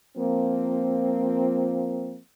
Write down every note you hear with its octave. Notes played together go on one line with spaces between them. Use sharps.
F3 A#3 C4